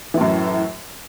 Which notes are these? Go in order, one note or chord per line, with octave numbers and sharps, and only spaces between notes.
F#2 A2 E3